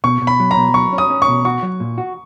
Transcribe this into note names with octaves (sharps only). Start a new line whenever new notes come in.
B2 C#6
B2
B5
F#3
A#5
B2
F#3 C#6
C#4
D#6
C#4
C#6
B2
F#4 C#6
F#3
A#2
F#4